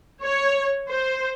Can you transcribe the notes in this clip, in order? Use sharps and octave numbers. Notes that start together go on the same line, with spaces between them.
C#5
C5